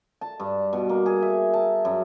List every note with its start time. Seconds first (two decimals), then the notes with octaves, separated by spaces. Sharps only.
0.21 A5
0.40 G2
0.73 B2
0.89 A#3
1.06 G#4
1.22 E5
1.54 A5
1.85 F#2